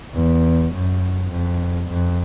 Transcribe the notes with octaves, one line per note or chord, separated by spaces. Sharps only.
E2
F#2
F2
F2